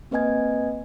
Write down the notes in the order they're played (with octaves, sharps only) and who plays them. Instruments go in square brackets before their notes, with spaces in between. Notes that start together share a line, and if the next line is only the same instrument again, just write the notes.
[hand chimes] A#3 C4 B4 D#5 G#5 G#6